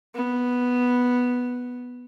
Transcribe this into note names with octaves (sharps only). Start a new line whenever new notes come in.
B3